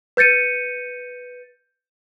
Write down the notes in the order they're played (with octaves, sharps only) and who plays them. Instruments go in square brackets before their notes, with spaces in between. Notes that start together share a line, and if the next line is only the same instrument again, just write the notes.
[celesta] B4 G6 A6 C#7 D#7